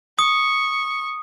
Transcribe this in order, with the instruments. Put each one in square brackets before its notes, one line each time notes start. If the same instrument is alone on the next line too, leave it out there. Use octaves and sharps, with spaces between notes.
[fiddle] C#6 [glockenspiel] D#6